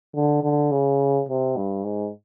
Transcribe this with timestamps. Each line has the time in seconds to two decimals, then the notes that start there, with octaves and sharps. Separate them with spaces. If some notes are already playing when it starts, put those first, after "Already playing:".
0.15 D3
0.43 D3
0.72 C#3
1.29 C3
1.56 G2
1.84 G#2